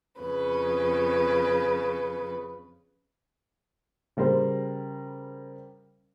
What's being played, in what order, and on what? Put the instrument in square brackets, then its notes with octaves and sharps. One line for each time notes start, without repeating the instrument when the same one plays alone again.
[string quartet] F2 C#3 B4
[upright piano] C#3 G3 A#4 C5